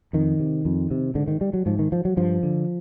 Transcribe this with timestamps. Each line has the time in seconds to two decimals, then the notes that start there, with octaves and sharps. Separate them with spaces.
0.13 F2 D#3
0.39 C3
0.65 F2
0.91 C3
1.15 G#2 D3
1.28 D#3
1.41 G3
1.53 F#3
1.66 G#2 F3
1.79 D#3
1.92 F3
2.05 F#3
2.17 G2 F3
2.43 D3